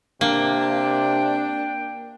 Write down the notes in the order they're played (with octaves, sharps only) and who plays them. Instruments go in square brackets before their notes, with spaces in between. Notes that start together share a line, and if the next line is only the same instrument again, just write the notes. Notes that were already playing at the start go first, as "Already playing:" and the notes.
[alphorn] C3 [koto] A#3 [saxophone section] D4 [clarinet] G5